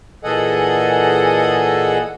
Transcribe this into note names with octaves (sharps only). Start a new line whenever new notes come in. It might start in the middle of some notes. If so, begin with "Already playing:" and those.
A#2 E3 G#4 A4 D#5 F#5